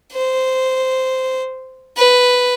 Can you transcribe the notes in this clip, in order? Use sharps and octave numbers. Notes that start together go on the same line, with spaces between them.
C5
B4